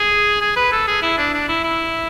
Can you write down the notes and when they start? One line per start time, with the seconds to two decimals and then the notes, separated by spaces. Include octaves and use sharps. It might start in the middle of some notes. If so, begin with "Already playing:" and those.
Already playing: G#4
0.41 G#4
0.56 B4
0.72 A4
0.87 G#4
1.02 E4
1.18 D4
1.34 D4
1.48 E4
1.64 E4